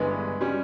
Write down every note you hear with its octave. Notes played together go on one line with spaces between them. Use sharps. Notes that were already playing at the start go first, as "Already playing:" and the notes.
Already playing: G1 G2 E3 G#3 B3
G3 C#4